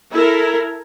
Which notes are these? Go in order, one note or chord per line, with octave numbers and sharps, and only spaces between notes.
E4 A4 A#4